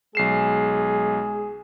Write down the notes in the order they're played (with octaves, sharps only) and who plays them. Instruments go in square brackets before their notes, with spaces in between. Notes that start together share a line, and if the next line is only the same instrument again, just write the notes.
[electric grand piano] B1 C7 E7 [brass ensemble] G#3 G#4